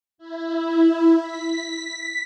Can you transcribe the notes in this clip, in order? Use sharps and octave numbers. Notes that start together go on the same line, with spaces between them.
E4
B6